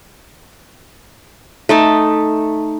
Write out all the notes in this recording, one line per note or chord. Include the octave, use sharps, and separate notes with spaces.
A3 D#4 A5